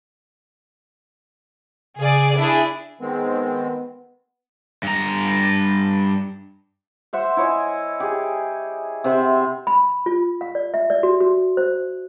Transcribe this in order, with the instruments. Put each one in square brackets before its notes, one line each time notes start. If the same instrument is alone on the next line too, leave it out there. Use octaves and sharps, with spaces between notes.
[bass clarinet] C#3 [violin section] G#4 D5
[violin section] D4 E4 G#4
[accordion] D#3 G#3 C4 [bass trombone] B3
[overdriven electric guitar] G2 A#5
[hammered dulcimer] C5 E5 F#5
E4 C#5 D#5 G#5
G4 G#4
C3 C5 E5 F#5
[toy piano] B5
F4
F5
D5
E5
D5
F#4
F#4
C5